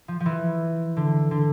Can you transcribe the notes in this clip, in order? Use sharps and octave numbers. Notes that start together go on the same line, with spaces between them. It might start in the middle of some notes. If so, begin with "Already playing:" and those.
F3
F3
E3
D3
D3